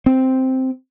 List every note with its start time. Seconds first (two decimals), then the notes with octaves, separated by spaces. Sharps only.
0.06 C4